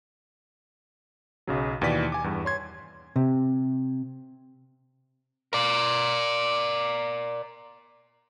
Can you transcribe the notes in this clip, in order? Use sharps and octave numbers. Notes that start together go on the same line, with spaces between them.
B1 C#3 F#3
D#2 B2 E3 D5 B6 D#7
G#5 D6
E2 G2
C#5 C6 G#6
C3
A#4 D5